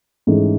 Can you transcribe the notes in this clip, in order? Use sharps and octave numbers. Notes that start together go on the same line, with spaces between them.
G#2 E3 A3 C#4 G#4